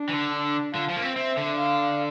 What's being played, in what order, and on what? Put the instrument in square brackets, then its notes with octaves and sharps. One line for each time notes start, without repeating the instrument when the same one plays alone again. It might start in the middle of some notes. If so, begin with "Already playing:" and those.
Already playing: [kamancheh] D4
[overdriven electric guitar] E3
D3
[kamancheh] D4
[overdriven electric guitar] D3 [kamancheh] F4
[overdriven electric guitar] F3
A#3
C4
[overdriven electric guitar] C4 [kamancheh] E5
[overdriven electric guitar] D3
[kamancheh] F5